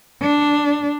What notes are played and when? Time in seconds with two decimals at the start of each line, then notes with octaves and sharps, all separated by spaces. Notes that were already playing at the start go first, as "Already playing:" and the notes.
0.22 D4